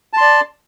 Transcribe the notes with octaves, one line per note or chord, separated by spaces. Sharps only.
D5 A5 C6